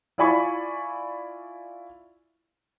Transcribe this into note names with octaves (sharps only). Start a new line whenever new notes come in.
E4 F4 D5 G#5 B5 C#6